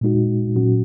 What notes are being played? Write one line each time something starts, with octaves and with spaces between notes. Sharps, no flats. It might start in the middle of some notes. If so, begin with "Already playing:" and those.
A#2 G#3 D#4 F#4
A#2 F#3 C#4 F#4